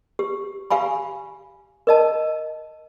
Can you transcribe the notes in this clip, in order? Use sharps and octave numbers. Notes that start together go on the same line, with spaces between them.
G4
G4 F5 G#5 B5
A#4 D#5 A5